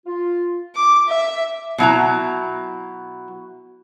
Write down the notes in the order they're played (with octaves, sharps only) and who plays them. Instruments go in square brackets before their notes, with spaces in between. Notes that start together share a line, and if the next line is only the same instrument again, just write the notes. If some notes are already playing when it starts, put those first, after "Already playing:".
[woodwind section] F4
[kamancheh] D6
E5
[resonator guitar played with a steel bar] B2 F#3 E4 A#5